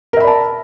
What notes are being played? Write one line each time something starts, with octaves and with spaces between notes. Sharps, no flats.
A#4 D5 E5 A5 B5